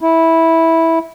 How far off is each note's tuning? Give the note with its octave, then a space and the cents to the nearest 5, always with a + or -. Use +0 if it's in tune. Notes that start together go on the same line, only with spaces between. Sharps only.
E4 -10